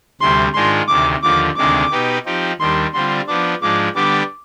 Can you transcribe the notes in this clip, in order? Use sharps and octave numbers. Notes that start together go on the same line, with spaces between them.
D2 C3 G3 C6
G#2 D#3 G#3 D4 F4 C6
D2 C3 D#3 D6
D#2 D3 F3 D6
D2 C3 D#3 G#3 D4 D6
B2 B3 D#4 G4 B4
F3 C4 D#4 G4
D#2 D#3 G3 D4 C6
D3 G3 C4 F4 C6
F3 B3 D4 D6
G#2 F3 G#3 D4 D6
D3 G3 B3 D4 G4 D6